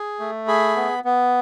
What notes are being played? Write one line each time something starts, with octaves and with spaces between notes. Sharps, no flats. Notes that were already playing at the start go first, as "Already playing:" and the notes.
Already playing: G#4
A3
G#4 B5
B3
B3